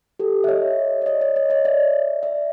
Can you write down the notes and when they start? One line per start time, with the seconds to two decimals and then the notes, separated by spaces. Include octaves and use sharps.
0.19 G4 A4
0.44 E5
0.48 C#5 D#5
1.02 D5
1.06 C#5 D#5
1.21 C#5 D#5
1.36 C#5 D#5
1.50 C#5 D#5
1.65 D5 E5
2.23 D5 E5